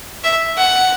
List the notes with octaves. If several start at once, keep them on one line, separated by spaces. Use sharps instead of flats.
E5
F#5